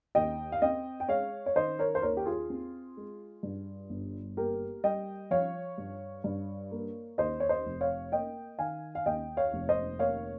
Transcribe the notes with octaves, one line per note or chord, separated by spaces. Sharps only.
D#2 D#5 G5
F5
C4 D#5 G5
G5
G#3 C#5 F5
C#5
D#3 C5 D#5
A#4 C#5
C5
D#2 A#4 C#5
G4
F4 G#4
C4
G#3
G2
G1
A#3 G4 A#4
G3 D#5 G5
F3 C#5 F5
G2
G2
A#3
D#2 C5 D#5
C#5
C5 D#5
F1
C#5 F5
A#3 D#5 G5
D#3 F5 G#5
F5
D#2 D#5 G5
C#5 F5
F1
C5 D#5
A#3 C#5 F5